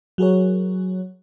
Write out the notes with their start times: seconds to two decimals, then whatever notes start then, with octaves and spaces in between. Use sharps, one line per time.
0.18 F#3 F#4 G#4 A#4 C#5